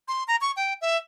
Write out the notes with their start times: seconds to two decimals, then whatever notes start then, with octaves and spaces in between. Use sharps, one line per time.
0.08 C6
0.28 A#5
0.41 C#6
0.57 G5
0.81 E5